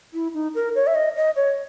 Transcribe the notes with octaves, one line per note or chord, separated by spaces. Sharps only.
E4
D#4
A#4
C#5
E5
D#5
D#5
C#5